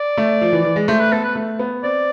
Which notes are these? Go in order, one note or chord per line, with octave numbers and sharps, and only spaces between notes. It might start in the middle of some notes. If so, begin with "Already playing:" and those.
Already playing: D5
A3
F3
E3
E3
G#3
A3 C5
B4
B3 A4
B4
A3
B3
C4 D5